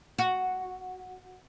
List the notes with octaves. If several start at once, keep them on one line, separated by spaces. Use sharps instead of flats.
F#4